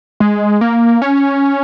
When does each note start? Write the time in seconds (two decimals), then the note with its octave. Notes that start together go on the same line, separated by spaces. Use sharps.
0.20 G#3
0.61 A#3
1.02 C#4